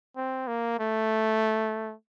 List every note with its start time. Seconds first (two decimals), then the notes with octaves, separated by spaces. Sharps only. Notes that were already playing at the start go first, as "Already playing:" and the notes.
0.16 C4
0.47 A#3
0.79 A3